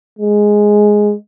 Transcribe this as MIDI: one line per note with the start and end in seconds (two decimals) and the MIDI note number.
0.19 1.14 56